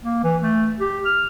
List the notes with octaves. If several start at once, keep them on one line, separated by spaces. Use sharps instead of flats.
A#3
E3
A3
G4
F6